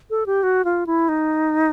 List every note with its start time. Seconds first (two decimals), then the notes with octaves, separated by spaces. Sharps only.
0.10 A4
0.26 G4
0.43 F#4
0.65 F4
0.87 E4
1.09 D#4